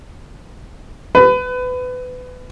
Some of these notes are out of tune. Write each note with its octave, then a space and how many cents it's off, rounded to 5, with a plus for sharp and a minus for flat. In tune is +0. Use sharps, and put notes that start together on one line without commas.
B4 +25